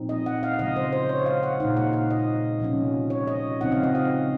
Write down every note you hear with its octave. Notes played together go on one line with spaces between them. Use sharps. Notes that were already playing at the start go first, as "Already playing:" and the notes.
Already playing: A#2 F3 C4 D#4
D#5
F#5
F5
C#3 F3 G#3 D#5
C5
C5
C#5
F5
F#5
A#2 G#3 D#4 F5
F#5
F5
D#5
C3 F3 G#3 C#4
C#5
D#5
C#3 F3 G#3 C4 D#4 F#5
F5
D#5
F5